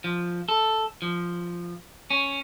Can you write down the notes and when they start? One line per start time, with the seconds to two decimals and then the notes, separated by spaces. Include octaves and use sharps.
0.04 F3
0.49 A4
1.02 F3
2.10 C#4